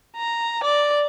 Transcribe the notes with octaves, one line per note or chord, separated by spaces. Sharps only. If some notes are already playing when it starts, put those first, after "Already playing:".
A#5
D5